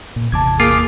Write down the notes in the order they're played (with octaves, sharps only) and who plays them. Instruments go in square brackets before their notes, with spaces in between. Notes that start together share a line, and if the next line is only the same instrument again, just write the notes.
[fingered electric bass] A#2
[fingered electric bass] G#1 E2 C3 [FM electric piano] A5 D6 G#6
[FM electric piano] A#3 [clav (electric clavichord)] F4 [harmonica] G#4 D6